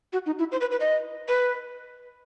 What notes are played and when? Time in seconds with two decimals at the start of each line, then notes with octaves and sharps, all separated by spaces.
0.13 F#4
0.26 D#4
0.39 E4
0.52 C5
0.61 B4
0.71 B4
0.80 D#5
1.28 B4